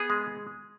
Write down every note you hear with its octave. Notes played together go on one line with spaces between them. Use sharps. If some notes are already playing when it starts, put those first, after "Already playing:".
Already playing: B3 G#4
G#3